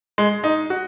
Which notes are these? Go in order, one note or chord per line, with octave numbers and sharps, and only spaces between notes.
G#3
D#4
F#4